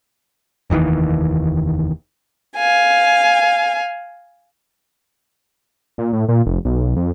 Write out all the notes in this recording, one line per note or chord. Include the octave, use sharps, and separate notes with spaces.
F1 D#2 D#3 E3
F5 G#5
A#2
A2
A#2
F1
B1
F2